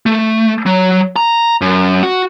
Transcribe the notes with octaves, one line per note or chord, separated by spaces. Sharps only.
A3
F#3
A#5
F#2
F#4